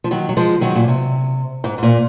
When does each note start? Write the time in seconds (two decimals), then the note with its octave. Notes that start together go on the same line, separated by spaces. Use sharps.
0.04 F3
0.11 D#3 F#3
0.29 F#3
0.37 F3 G#3
0.61 D#3 F#3
0.75 A#2
0.88 C3
1.64 G#2
1.78 G#2
1.83 A#2